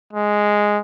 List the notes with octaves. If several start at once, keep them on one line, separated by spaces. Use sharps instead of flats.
G#3